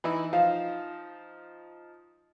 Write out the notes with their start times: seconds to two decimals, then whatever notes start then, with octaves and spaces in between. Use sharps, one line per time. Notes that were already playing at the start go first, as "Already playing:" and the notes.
0.04 E3 D#4 E4 B5
0.33 F3 D#4 F5